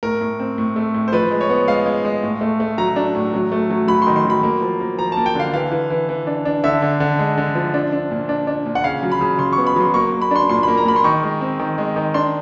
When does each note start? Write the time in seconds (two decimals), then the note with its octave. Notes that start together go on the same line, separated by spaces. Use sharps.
0.03 A2 A#4
0.21 A2
0.40 C4
0.58 A2
0.76 A3
0.94 A2
1.08 C5
1.12 F3 B4
1.31 G#3
1.41 C#5
1.49 B3
1.68 G#3 F5
1.86 G#3
2.05 G#3
2.23 A2
2.41 A3
2.60 A3
2.78 F#3 A#5
2.96 D4
3.15 A2
3.34 F#3
3.52 A3
3.70 F#3
3.88 F#3 B5
4.02 D#3 C6
4.16 C6
4.25 F#3 B5
4.43 A#3
4.62 F3
4.80 A#3
4.99 F3 A#5
5.12 A#3 A5
5.26 G5
5.35 D3 F5
5.54 E3 F5
5.72 E3
5.90 E3
6.09 E3
6.27 D4
6.45 D4
6.64 D3 E5
6.82 D3
7.00 D3
7.19 G#3
7.38 D3
7.55 F3
7.74 D4
7.92 D4
8.11 A#2
8.29 D4
8.47 D4
8.66 A#2
8.75 F#5
8.84 C#3 F5
9.03 F#3
9.12 B5
9.21 C#3
9.39 C#3 C6
9.53 C#6
9.58 B3
9.67 B5
9.76 F#3 C6
9.94 A#3 C#6
10.12 A#3
10.22 B5
10.31 D4 C6
10.49 A#2 C6
10.63 A#3 B5
10.77 A#5
10.85 A#2 B5
10.96 C6
11.04 D#3 C#6
11.23 G#3
11.41 C4
11.60 D#3
11.78 G#3
11.96 D#3
12.14 D4 C6